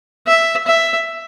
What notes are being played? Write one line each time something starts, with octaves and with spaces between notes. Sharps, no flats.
E5
E5